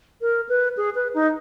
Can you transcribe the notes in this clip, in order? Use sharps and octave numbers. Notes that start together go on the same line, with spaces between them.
A#4
B4
G#4
B4
D#4